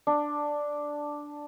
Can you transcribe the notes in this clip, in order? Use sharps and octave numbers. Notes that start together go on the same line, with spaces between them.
D4